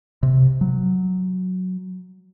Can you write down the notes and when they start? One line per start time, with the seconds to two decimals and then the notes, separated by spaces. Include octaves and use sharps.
0.23 C3
0.61 F#3